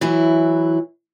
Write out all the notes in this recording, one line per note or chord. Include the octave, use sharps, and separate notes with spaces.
E3 F#3 E4